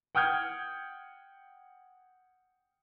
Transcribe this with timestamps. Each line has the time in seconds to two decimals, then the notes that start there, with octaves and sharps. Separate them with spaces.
0.15 F#5 G5 D#6 F6 G6 G#6